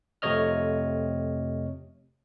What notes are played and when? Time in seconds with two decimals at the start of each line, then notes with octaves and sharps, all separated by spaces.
0.22 F2 C3 A3 C#5 D#5 F6